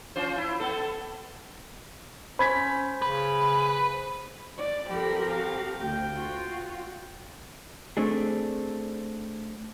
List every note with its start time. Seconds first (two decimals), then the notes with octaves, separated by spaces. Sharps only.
0.16 C#4 F4 C5
0.37 E4
0.60 B3 A4
2.39 C#4 C5 B5 G#6 B6
3.02 C#3 B4
4.58 D5
4.90 F3 C4 G4 A4 A#4 B5
5.29 F5
5.80 D2 G5
6.15 F4 F#4
7.97 A3 C4 D4 G#4